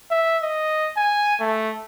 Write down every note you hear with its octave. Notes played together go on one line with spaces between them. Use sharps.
E5
D#5
G#5
A3